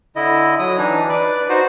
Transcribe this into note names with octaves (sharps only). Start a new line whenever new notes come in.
D3 E4 D#5
F#3 D#6
E3 D4 D#4
B4 D5
D#4 F#4 C5